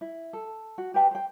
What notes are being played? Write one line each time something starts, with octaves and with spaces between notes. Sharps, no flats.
E4
A4
F#4
G4 B4 G5 A5
C5 G5